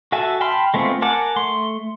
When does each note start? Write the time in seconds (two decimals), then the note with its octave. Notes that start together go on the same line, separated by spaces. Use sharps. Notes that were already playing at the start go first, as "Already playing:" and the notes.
0.12 F#4 A4 E5 G#5 A5
0.41 G5 A5 B5 C6 F6
0.74 G#3 A3 B3 C4 F4
1.02 A#4 F#5 G#5 A5 D6
1.36 A3 C6